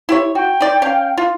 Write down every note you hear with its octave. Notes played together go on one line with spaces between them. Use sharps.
E4 G4 C#5
F#4 G5
D#4 D5
C#4 F5
F4